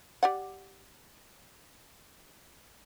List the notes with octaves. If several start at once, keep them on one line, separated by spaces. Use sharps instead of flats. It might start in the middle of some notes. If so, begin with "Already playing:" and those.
G4 D5 F#5